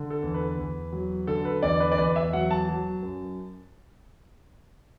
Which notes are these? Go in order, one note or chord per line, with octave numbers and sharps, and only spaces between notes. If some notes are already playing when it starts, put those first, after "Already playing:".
Already playing: D3
A4
E2
B4
E2
F#3
D3 A4
B4
E2 D5
B4
D5
E2 B4
E5
F#3 F#5
A5
F#3
F#2